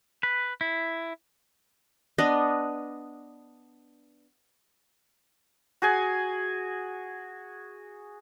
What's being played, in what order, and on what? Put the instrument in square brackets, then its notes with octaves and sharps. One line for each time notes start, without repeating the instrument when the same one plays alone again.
[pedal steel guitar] B4
E4
[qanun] B3 D4 D#5
[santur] F#4 G#4 G#5